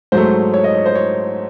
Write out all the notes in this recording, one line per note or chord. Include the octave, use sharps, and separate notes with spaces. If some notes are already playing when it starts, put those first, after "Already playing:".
G#2 F#3 A3 C5
C#5
D#5
C#5
C5
C#5